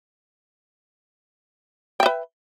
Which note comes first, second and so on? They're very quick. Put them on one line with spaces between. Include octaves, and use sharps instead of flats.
G5 E5 B4